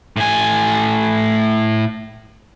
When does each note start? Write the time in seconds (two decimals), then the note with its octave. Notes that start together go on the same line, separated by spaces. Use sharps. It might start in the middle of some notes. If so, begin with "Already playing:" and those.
0.17 A2 G#5